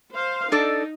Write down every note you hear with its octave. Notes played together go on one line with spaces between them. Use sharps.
C5 F5
D4 D#4 A4 D5